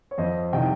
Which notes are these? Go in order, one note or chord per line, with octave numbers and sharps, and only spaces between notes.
C#5
F2 C5 D#5
C3 D#3 G3 D#5 G5